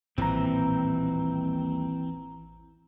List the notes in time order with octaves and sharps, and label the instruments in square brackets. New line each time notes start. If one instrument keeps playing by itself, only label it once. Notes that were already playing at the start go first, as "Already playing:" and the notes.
[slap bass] D#1 A#2 G3 [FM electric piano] A1 A#5 [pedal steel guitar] E3 C4